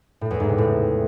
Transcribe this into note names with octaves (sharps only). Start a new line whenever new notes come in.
A2
E2
G#2
C3
A2